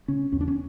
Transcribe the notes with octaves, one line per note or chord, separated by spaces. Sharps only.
C#3 C#4
E2 C#4
D4
C#4